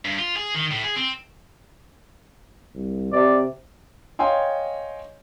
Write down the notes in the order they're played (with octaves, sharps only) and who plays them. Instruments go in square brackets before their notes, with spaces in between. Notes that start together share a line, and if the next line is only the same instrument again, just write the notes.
[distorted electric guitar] G2
F4
G#4
D#3
A2
G#4
C4
[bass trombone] C2
[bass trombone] C3 [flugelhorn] D5
[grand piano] C#5 D#5 F5 G5 G#5 C6